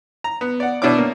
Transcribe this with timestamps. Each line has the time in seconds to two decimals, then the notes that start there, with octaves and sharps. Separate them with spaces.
0.24 A#5
0.41 B3
0.60 D5 F#5
0.82 B2 D4 E4 C#5 D6
0.98 A#3